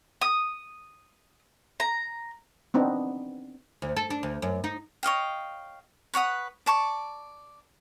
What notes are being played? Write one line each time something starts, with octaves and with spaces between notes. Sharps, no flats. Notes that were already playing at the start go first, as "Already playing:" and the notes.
D#6
A#5
B3 C4 D4 D#4
D2
A4
D4
D2
F#2
D#4
C#5 D#5 F5 G5
B4 C#5 F#5 D#6
D5 A5 C#6